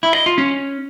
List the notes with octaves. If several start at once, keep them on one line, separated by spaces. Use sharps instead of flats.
E4
D#5
F4
C#4